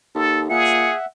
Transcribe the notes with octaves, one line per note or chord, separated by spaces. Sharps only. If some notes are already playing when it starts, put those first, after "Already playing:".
D#2 A4
A#2 G#4 E5 F#5 C#7